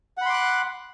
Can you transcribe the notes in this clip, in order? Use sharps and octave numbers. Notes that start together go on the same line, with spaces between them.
F#5 B5 C6 D6 F#6